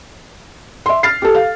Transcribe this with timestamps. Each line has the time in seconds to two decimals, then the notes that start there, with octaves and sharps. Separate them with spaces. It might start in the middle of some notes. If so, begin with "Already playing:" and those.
0.86 E5 C6
1.03 F6 A6 C7
1.22 G4 A4
1.35 F5